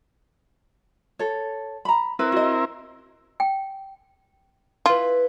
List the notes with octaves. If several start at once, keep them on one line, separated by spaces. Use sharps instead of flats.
A4 C#5
A#5 B5
C4 E4 A#4 B4
F#4 D#5
G5
E4 F4 B4